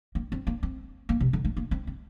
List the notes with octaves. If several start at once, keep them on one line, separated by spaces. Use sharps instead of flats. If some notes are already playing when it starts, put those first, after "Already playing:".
A#3
C4
A#3
C4
A#3
C3
D3
A3
A#3
C4
C4